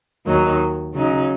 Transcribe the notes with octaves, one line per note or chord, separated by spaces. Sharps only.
D#2 D#3 F#3 D#4
C#3 F#3 D#4